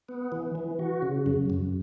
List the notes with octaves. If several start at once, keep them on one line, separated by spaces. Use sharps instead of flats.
B3
E3
E3
F#4
C#3
F#2
F#2